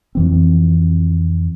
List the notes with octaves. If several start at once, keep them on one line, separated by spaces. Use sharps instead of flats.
F2 E3 C4